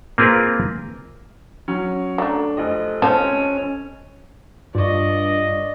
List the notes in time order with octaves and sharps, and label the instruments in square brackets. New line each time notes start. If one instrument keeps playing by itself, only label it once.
[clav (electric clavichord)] A#3 C4 F4 G#4 A#4 B4
[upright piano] F#3 C#4
[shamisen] F#3 A3 [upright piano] D4
[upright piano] F1 F3 D#5
[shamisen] C4 C5 A5 [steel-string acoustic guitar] C#4
[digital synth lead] G2 [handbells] F4 C#6 [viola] D5 D#5